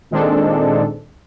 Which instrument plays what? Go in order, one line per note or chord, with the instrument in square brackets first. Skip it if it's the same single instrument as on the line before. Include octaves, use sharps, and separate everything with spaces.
[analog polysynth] A#2 D#3 G#3 C4 D4 A4